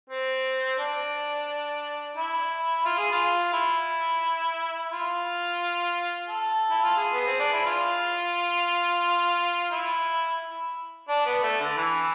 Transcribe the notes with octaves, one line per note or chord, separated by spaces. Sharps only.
C4
D4
E4
F4
G#4
F4
E4
F4
A4
E4
F4
G#4
B3
C4
D4
E4
F4
E4
D4
B3
A3
D3
E3